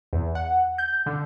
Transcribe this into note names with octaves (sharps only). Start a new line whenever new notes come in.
E2
F#5
G6
D3